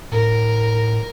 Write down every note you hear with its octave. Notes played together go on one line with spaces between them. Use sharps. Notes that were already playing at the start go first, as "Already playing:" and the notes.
A2 A#4